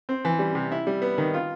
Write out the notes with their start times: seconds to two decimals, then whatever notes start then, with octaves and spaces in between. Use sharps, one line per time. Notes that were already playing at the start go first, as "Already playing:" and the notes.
0.09 C4
0.25 E3
0.39 G3
0.55 C3
0.72 E4
0.87 G3
1.02 B3
1.18 D#3
1.34 F4